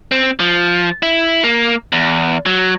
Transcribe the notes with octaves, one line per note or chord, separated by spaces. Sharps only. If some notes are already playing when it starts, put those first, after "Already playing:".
C4
F3
E4
A#3
E2
F#3